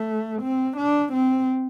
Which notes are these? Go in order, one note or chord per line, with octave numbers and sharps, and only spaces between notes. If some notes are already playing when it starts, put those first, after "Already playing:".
Already playing: A3
C4
D4
C4